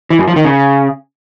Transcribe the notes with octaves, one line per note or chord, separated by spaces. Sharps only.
E3
F#2
F3
D#3
C#3